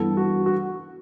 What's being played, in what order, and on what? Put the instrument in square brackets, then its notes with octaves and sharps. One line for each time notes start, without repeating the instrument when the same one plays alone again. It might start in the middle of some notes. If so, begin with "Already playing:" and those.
Already playing: [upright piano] G2 E3 B3 [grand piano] A4
[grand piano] F#4
F#4